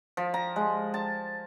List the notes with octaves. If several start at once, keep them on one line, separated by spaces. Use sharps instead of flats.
F3
A#5
G#3
A5